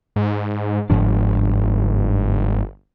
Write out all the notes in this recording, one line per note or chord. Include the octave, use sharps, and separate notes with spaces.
G#2
G1 G#2 F3 D4